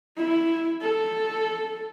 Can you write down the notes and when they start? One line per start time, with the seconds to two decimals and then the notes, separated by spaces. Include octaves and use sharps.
0.17 E4
0.82 A4